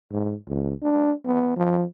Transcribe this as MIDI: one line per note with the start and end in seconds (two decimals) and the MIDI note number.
0.11 0.35 44
0.47 0.73 37
0.83 1.13 62
1.25 1.55 59
1.57 1.84 53